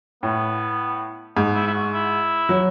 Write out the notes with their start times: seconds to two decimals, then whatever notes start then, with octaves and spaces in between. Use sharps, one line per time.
0.23 A2 B3
1.37 G#2 D#4
1.55 E4
1.67 E4
1.74 F#4
1.92 E4
2.49 F#3